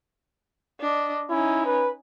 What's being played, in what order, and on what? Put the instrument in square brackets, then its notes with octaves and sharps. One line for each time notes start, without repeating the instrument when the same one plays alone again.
[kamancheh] D4 D#5
[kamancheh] C#4 D#4 [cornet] E4
[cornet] B4